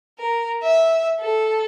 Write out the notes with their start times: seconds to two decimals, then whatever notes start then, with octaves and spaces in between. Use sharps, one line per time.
0.18 A#4
0.63 E5
1.20 A4